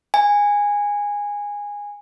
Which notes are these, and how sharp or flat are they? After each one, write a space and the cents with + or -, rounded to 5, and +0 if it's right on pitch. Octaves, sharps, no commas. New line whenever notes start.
G#5 -15